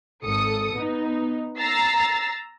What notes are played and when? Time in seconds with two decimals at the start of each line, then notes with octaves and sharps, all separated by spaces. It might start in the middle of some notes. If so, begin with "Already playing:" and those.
0.25 G#1 A4 D#6 C#7
0.76 B3 D#4
1.58 A#5 E6 A6 C7